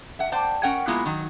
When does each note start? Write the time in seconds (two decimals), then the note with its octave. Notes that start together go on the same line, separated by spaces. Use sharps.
0.19 E5 F#5
0.32 C5 D5 F#5 G5 A5
0.63 C#4 A#4 F#5 G5
0.87 G#3 A#3 B3 E4 F4
1.06 D#3 F#3